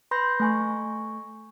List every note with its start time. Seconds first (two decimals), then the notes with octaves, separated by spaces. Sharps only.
0.11 B4 B5 C6 G6 A#6
0.40 A3 G#5 C#6